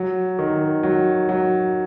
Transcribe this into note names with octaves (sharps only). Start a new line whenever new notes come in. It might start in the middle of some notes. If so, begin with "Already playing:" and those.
Already playing: F#3
D#3
F#3
F#3